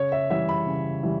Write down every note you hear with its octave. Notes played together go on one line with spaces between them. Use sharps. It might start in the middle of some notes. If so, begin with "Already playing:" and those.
Already playing: C#3 C#5
E5
E3 G3 E5
B5
C#3
E3 G3